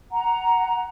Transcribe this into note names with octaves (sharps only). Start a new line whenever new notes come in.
F#5 A#5